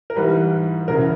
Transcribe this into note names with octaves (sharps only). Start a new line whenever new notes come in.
A#4
G#2 E3 G3 B4
E2 C#3 E3 A#4